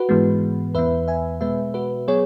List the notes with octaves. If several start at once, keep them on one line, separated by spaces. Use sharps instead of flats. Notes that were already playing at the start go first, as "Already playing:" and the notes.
Already playing: F#4 B4
G#2 E3 G#3 B3
E2 E3 B3 B4 E5
E5 G#5
B2 G#3 B3 B4 E5
F#4 B4
F#3 B3 G#4 C#5